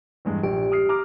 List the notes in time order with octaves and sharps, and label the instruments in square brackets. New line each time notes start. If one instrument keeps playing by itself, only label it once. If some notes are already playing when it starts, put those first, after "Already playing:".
[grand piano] E2 G2 G#3
[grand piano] A#1 [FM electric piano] G4
[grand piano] D#6 F6 C7
A#5 D6 F6